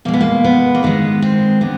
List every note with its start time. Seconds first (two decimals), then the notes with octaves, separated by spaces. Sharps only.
0.05 B2 A#3
0.08 G#3
0.14 B3
0.21 A#3
0.44 B3
0.75 A#3
0.83 G#2 D#3 G#3 B3
1.22 C4
1.61 D3 B3